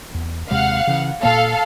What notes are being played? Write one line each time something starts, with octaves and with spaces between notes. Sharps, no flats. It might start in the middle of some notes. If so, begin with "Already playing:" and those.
E2
D#2 C3 G#3 F5 F#5
C#3 E3
A#2 A#3 A4 F5